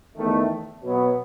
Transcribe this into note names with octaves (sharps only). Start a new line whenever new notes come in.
E2 D#3 A3
B2 F#3 B3